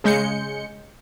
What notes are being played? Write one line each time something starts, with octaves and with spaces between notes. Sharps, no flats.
C#3 G#3 G6 C#7